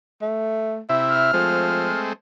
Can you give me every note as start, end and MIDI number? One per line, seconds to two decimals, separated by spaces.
0.22 0.81 57
0.89 1.32 48
0.89 1.32 64
0.89 1.33 76
1.09 1.99 89
1.33 1.92 53
1.33 2.13 56
1.33 2.13 57
1.33 2.13 60